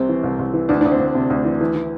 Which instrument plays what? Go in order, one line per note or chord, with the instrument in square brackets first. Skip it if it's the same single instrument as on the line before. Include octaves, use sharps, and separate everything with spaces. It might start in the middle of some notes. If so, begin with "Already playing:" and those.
Already playing: [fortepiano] C2 C3 C4
E3
C2
C2
E3
D2 D4
D2 D4
C4
D2
C3
D2
E3
E3
E3